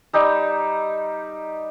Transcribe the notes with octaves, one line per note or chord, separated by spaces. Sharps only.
G3 D#4 E6